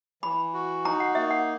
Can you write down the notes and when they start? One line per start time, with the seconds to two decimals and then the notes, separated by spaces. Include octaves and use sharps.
0.23 E3 B5
0.54 F#4
0.85 D#4 A#5
1.00 F#5
1.15 A#3 E5
1.31 F#5